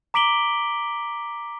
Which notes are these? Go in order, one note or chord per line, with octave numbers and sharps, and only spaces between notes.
A#5 D6 B6 D7 F#7 G7